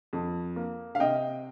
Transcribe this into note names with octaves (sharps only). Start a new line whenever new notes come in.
F2
A#3
F5
C3 D#5 G5